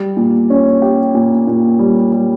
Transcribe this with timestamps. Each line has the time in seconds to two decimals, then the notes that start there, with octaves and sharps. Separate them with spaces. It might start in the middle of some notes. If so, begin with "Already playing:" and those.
Already playing: G3
0.17 A#2
0.50 C#4
0.82 G4
1.14 A#2
1.47 A#2
1.79 G3
2.12 G3